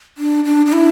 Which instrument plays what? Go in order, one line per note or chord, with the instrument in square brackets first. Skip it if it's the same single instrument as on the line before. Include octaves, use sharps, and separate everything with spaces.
[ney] D4
D4
D4
E4